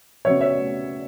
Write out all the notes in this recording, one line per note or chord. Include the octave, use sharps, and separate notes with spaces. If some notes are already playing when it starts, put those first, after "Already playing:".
C#3 F#3 B3 C#5 E5
C#5 E5